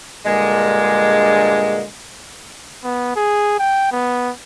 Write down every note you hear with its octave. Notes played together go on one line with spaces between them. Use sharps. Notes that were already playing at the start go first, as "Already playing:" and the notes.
G2 A#2 D3 G#3
B3
G#4
G5
B3